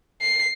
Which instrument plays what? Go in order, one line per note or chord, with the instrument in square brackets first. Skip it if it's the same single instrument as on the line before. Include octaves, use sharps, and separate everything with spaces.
[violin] C7